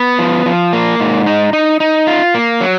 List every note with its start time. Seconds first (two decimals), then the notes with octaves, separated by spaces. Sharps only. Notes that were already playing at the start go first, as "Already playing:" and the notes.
Already playing: B3
0.19 F3
0.46 F3
0.73 A#3
1.00 G#2
1.26 D#4
1.53 D#4
1.80 D#4
2.07 F4
2.34 A#3
2.61 F#3